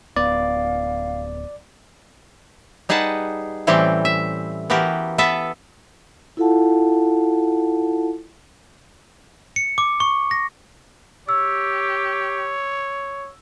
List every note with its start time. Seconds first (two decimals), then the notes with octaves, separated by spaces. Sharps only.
0.16 D1 B3 D5 F5
2.89 G3 D#4 G#4 B4 F#5 A5
3.67 A2 E3 G3 C4 C#4 G4
4.05 E5
4.70 E3 B3 F#4 G4 A#4
5.18 B3 A4 B4 E5
6.37 E4 F4 A4 F5 F#5 A5
9.56 C#7
9.78 D6
10.00 C#6
10.31 A#6
11.29 G4 C#5 E6